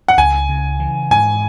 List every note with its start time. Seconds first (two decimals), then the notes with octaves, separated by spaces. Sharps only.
0.08 F#5
0.17 C#2 G#5
0.49 C#3
0.80 E3
1.11 G#2 G#5